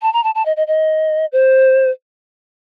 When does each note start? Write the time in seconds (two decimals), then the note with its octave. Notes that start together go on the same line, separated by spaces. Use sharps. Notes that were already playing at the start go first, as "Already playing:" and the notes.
0.02 A5
0.13 A#5
0.24 A5
0.35 A5
0.45 D#5
0.56 D#5
0.67 D#5
1.32 C5